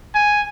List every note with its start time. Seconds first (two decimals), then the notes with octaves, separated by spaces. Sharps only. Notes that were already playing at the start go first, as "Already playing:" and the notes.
0.15 G#5